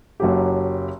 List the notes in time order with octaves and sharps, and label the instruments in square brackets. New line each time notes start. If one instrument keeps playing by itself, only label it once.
[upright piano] F#1 F#3 C#4 F#4 G4